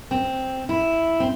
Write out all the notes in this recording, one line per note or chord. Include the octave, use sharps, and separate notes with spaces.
C4
E4
C4